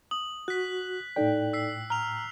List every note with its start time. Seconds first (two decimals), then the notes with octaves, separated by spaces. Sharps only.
0.11 D#6 F#7
0.48 F#4 F#6 B6
1.16 A2 D#4 A4 D5 G5
1.53 E6 B6 C7
1.90 A#5 F6 F7